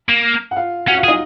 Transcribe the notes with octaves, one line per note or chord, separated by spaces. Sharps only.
A#3
F#5
F4 F5
C#4 F#4 F#5
F4 F5
G#4
D#4 D#5